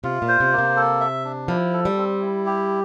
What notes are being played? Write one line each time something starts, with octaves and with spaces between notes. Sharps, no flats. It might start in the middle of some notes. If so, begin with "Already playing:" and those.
C3 F4
A#2
C5
C3
A#3
C3
A4
E5
D4
F3 E4
A4
G3
C4
E4
G4